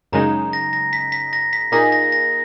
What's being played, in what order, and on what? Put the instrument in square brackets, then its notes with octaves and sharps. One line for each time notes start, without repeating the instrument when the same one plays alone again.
[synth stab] F#2 C#3 G#3 D#4 [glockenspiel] A#5
[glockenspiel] A#6
A#6
B6
B6
A#6
B6
[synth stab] A#2 A#3 D#4 G#4 [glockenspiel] A#6
[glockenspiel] A#6
A#6